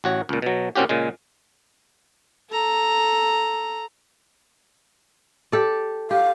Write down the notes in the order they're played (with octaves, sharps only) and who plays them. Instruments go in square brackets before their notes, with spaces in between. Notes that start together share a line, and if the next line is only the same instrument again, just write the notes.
[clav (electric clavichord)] A1 F#4 C#5
C#2 A#2
B2 F#3
A#2 C4 C#4 F#4 G4
A#2 C#3 G#3
[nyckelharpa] A4 A#5
[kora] G4 A4 D5
[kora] G4 [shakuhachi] F5